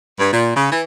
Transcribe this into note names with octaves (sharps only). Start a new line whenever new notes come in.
G2
A#2
C#3
E3